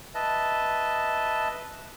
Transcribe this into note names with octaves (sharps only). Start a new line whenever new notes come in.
B4 D#5 E5 A5